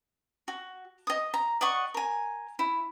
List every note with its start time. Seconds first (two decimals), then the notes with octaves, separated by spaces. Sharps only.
0.48 F#4
1.07 D#5 D#6
1.34 A#5
1.61 D5 D#5 F#5 C#6
1.94 A#4 G#5
2.59 E4